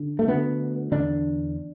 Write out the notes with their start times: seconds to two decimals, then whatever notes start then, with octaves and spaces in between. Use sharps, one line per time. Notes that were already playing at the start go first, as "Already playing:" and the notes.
Already playing: D3
0.19 A3
0.28 D2 D3 B3
0.92 E2 D3 D4